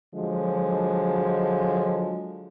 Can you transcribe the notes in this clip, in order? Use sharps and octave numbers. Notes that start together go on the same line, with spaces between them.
D3 F3 F#3 G#3